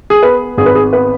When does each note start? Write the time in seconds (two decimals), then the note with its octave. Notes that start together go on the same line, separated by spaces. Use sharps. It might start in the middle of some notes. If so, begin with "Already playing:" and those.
0.10 G#4
0.23 B3 B4
0.57 G#1 G#4
0.66 B4
0.75 G#4
0.93 B3 B4